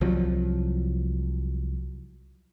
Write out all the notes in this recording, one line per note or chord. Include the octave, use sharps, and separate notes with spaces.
C2 F3 F#3